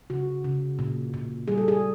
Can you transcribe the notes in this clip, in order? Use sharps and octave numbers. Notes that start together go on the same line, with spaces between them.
C#3 F#4
C#3
A#2
A#2
G3 G#4
A4
G#4